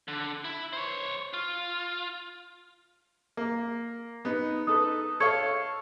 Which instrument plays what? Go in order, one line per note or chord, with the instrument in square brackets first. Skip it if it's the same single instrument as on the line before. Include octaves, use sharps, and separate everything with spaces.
[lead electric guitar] D3
E4
C5 C#5
F4
[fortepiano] A#3
B3 D#4
[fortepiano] D#4 A4 B4 [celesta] D#6
[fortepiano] A4 C#5 F5 [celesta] C#6 G#6 C#7